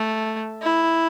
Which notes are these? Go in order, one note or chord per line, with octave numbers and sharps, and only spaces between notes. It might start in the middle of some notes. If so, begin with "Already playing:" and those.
Already playing: A3
E4